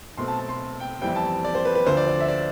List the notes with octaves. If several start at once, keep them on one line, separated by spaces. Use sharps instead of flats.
B1 B2 A3 C4 C6
A5
A5
C6
G5
G1 F2 E3 G3 C4 G5
A5
D5
C5
B4
B4
D2 D3 F3 C5
D5
D5
E5
D5